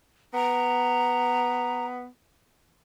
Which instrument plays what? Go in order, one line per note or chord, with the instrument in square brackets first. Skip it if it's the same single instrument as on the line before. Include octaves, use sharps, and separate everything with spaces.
[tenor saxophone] B3 [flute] A#5